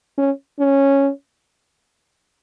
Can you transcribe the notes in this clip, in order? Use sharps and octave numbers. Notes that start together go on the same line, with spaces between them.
C#4
C#4